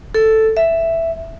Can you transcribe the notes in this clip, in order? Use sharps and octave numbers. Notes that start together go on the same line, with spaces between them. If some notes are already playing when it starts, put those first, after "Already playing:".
A4
E5